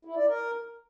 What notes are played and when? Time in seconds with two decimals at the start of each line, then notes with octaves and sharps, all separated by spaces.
0.05 E4
0.16 D5
0.28 A#4